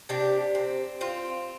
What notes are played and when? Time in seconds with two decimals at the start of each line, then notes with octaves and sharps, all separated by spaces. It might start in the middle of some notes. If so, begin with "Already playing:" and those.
0.09 C3 D4 G4
0.55 C4
1.01 C4 F4